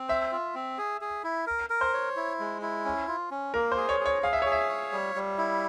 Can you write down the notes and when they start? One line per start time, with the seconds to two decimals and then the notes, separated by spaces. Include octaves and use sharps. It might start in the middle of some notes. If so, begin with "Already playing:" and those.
Already playing: C4
0.08 C5 E5
0.32 F4
0.55 C4
0.78 G#4
1.01 G#4
1.24 E4
1.47 A#4
1.70 A#4
1.81 C5
1.94 C#5
2.16 E4
2.40 G#3
2.62 E4
2.85 C#4
3.08 F4
3.31 C#4
3.54 A#3 A#4
3.72 C5
3.77 G#4
3.89 C#5
4.00 G#4
4.06 C#5
4.23 G#4 F5
4.33 E5
4.42 G#4 C#5
4.52 E5
4.69 C#5
4.92 G3
5.15 G3
5.38 E4